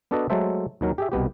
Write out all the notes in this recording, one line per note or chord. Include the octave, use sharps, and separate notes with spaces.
B3 D4 F#4 A4 B4 D#5
F#3 G#3 A3 A4 C5 E5
D#2 D#3 F#3 A#4
G4 G#4 E5
C2 B2 B3 G4